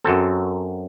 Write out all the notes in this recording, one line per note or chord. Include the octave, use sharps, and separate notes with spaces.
F#2 F#3 C4 A4